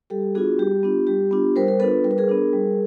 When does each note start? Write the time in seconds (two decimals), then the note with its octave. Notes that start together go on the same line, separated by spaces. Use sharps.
0.10 G3 G4 A4
0.35 B3 D4 F4 F#4 G#4
0.59 G3 G4
0.83 B3 D4 F4
1.07 G3 G4
1.31 B3 D4 F4
1.56 G3 A#4 C5
1.68 A#4
1.80 B3 D4 F4 A4 B4
2.04 G3 A#4
2.11 B4
2.18 G#4 A#4
2.29 B3 D4
2.53 G3